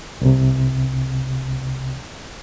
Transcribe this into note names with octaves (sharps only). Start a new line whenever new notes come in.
C2 C3